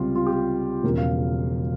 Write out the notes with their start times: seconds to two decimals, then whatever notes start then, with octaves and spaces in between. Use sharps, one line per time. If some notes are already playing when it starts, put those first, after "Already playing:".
Already playing: C#2 C3 G3 F4
0.15 F4
0.26 G4
0.83 E1 E2 C#3 F3 A#4
0.98 F5